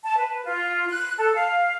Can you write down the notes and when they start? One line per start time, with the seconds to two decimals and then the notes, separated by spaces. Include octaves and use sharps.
0.04 A5
0.17 B4
0.44 F4
0.89 F#6
1.18 A4
1.35 F5